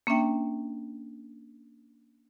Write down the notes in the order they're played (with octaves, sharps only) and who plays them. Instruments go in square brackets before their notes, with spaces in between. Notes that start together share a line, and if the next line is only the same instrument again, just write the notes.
[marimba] A#3 C#4 D4 E5 G5